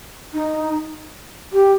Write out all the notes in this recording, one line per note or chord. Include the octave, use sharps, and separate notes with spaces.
D#4
G4